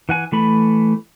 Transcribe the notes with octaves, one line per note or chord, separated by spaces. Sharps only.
E3 F#5 G#5
E3 A3 B5